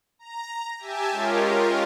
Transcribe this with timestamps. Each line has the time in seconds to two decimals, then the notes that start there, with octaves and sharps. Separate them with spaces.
0.19 A#5
0.78 G4 E5 G#5 A5
1.11 G#3 C#4 F4 G4 A#4